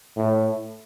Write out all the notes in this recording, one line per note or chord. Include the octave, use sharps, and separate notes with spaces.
A2